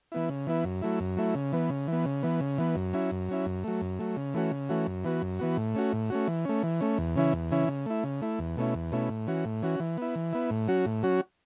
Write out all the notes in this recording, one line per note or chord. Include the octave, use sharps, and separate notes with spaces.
E3 B3 E4
C#3
E3 B3 E4
F#2
F#3 A3 E4
F#2
F#3 A3 E4
C#3
E3 B3
C#3
E3 B3
C#3
E3 B3
C#3
E3 B3
F#2
F#3 C#4 E4
F#2
F#3 C#4 E4
F#2
F#3 A3
F#2
F#3 A3
C#3
E3 A3 C#4 F#4
C#3
E3 A3 C#4 F#4
F#2
E3 B3 F#4
F#2
E3 B3 F#4
A2
A3 C#4 F#4
A2
A3 C#4 F#4
E3
A3 C#4
E3
A3 C#4
E2
C#3 E3 C#4 E4
E2
C#3 E3 C#4 E4
C#3
A3 E4
C#3
A3 E4
E2
B2 A3 C#4 E4
E2
B2 A3 C#4 E4
A2
E3 C#4 F#4
A2
E3 C#4 F#4
E3
B3 E4
E3
B3 E4
A2
F#3 C#4 F#4
A2
F#3 C#4 F#4